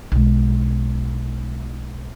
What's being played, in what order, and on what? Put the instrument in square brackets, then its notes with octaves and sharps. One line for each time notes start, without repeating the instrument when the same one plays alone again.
[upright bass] B1 G#3